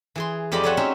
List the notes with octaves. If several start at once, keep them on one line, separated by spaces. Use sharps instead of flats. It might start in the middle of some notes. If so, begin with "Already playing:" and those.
E3 G#4 C6
F2 G4 C5 D5 D#5 B5
A4 C5 C#5 E5 F#5 G#5
C4 C#4 D#4 F#4 E5